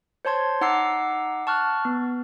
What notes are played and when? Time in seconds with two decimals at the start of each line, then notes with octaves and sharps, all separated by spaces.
0.25 C5 C#5 A5 C6 G#6
0.61 D#4 F#5 A#5 D6 E6 C7
1.47 A5 C#6 F6 F#6
1.85 B3